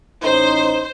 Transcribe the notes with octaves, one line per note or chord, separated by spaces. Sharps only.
A1 C#4 D#4 C5